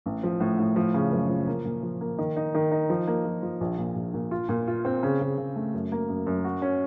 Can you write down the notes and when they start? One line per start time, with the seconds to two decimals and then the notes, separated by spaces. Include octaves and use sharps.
0.06 A1
0.23 F3
0.40 A2
0.59 A2
0.76 F3
0.94 C#3
1.12 F#1
1.29 F3
1.47 A#3
1.65 A#2
1.83 F3
2.01 A#3
2.18 D#3
2.36 D#4
2.54 D#3
2.71 D#4
2.89 F3
3.07 A#3
3.25 F3
3.42 F3
3.61 A#1
3.78 A#2
3.96 A#1
4.14 A#2
4.31 F4
4.49 A#2
4.68 F4
4.85 C4
5.03 C#3
5.21 C#3
5.38 C#3
5.56 A3
5.74 F#2
5.92 A#3
6.09 F#2
6.27 F#2
6.44 F#4
6.62 C#4